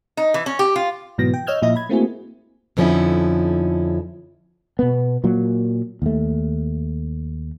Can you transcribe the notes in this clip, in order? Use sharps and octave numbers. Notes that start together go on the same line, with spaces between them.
D#4
E3
C#4
G4
F4
G#2 B2 E3 F#3 B3 A#6
G5
C#5 D#5 E6 F6 G6 G#6
A#2 F3 E4 D#5 E5 A#6
B5 G#6
A3 A#3 C4 E4 F#4 G#4
F2 D3 F3 C#4 D#4 E4
B2 B3
A#2 F#3 A#3
D#2 A3